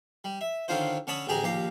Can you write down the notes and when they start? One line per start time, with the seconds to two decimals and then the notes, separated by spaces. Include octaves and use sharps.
0.24 G3
0.41 E5
0.68 D3 D#3 C#4 D4 F4 C5
1.07 D3 C#4 C#5 A5 B5 D#6
1.27 A1 D2 G4 G#4 G#5 A#5
1.44 A#1 D#2 G4 F5 A#5